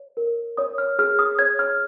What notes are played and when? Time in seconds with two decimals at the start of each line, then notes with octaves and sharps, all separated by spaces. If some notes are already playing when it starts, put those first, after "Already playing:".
Already playing: C#5
0.17 A#4
0.57 C#5 D#6
0.78 F6
0.99 G#4 F6
1.19 D#6
1.39 C#5 G#6
1.59 F6